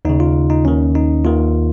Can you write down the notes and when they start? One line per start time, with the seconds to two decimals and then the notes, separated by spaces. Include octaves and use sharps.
0.05 D#2 C#3 D#4
0.20 F4
0.50 D#4
0.65 D#2 D#3 C#4
0.95 D#4
1.24 D#2 D#3 F4